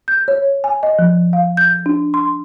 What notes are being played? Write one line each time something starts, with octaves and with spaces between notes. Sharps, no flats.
G6
C#5
G#5
D#5
F3
F5
G6
D4
C6